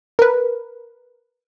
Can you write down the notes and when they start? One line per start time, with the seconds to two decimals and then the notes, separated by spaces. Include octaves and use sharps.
0.19 A#4 B4